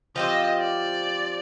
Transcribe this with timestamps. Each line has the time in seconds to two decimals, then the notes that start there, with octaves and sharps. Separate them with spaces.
0.16 F3 C4 G4 D#5
0.60 D5